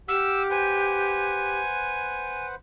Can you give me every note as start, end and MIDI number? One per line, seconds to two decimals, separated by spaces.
0.08 1.60 67
0.08 0.48 78
0.08 0.48 86
0.08 0.42 88
0.08 0.48 89
0.50 2.55 71
0.50 2.55 72
0.50 2.55 78
0.50 2.47 80